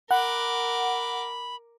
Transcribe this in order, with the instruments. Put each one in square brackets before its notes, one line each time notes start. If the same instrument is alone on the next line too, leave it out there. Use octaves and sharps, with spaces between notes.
[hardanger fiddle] A#4 D6 [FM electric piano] F#5 [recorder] B5